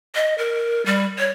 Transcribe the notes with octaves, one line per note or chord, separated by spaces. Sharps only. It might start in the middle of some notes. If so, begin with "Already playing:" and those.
D#5
A#4
G3
C#5